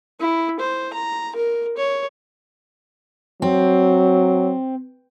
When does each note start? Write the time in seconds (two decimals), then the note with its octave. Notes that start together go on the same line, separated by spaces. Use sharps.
0.20 E4
0.60 C5
0.93 A#5
1.36 A#4
1.77 C#5
3.42 F#3 C4